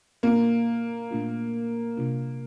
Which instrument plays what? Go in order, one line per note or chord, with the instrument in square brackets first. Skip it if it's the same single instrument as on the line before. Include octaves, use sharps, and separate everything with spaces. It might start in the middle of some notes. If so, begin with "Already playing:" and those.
[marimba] A#2 A3 D4 F4 [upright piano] A#3
[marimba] A#2 A3 D4 F4
C3 G3 D4 F4